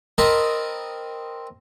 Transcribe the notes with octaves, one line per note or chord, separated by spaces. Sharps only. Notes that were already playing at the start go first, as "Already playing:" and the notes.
C4 A#4 D#5 A5 B5